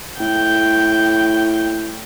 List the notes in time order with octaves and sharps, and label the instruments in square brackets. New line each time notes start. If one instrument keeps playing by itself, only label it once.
[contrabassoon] A2 [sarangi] G5